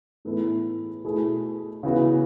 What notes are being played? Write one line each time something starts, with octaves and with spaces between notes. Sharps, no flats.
A2 E3 B3 E4 A4
B2 A3 E4 G#4
C#3 E3 B3 F#4